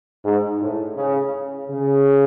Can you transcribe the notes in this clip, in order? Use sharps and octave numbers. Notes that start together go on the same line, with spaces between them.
G#2
A2
C#3
C#3